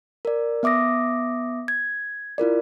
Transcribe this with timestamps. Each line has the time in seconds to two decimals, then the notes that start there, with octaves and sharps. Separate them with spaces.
0.25 A#4 D5
0.63 B3 E5 D6 D#6 A#6
1.68 G#6
2.38 E4 F4 A#4 D5